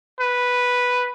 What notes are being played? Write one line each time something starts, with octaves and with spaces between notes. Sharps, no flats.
B4